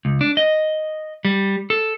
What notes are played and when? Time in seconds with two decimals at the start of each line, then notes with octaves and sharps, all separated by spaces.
0.05 C#2
0.21 D4
0.37 D#5
1.25 G3
1.70 A4